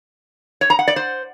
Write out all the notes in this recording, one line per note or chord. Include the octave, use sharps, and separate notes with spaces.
C#5
A#5
F#5
D5
C5